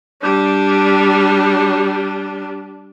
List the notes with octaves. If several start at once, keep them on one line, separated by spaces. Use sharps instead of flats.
G3 D4